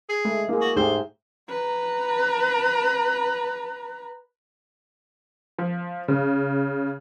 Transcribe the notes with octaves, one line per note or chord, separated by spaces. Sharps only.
G#4
G#3 A3
A#3 E4 G#4
F#4
G#2 A3 G4 G#4 C5
B4 A#5
F3
C#3